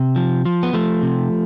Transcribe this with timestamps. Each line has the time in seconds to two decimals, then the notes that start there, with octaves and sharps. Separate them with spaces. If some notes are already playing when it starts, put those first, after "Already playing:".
Already playing: C3
0.16 F3
0.45 F3
0.63 B3
0.73 F3 A3
1.02 C3